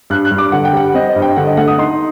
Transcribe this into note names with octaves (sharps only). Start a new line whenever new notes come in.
G2 F#6
F#6
G2
D6
D3 F#5
G5
G3 F#5
C4 D#5
D#5
G2
G5
D3 F#5
D#5
A3 F#5
D#6
D#4 C6